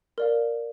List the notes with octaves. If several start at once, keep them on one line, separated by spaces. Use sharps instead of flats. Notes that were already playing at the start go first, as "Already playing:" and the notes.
A#4 D5 F5